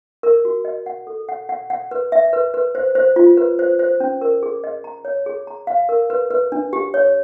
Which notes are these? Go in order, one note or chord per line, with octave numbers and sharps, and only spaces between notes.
A#4
F#4
D#5
F#5
A4
F#5
F#5
F#5
B4
E5
B4
B4
C5
C5
F4
B4
C5
C5
C#4
A#4
G#4
D#5
A#5
C#5
G#4
A#5
F5
A#4
B4
B4
D4
G4
C#5